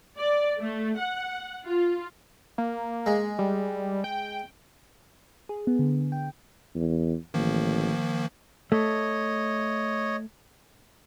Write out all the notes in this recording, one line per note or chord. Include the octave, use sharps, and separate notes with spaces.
D5
A3
F#5
F4
A#3
G#3
G3
G5
G#4
B3
D3
G5
E2
A1 D#3 F3 A#3
A3 C#5 D#5